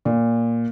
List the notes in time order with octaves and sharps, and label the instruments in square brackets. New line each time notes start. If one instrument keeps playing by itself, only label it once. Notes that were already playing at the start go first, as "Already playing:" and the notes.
[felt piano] A#2